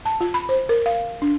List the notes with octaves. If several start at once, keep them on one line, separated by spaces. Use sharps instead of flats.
A5
F4
B5
C5
A#4
F5
D4